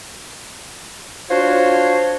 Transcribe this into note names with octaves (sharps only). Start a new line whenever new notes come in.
D4 F4 F#4 C5 C#5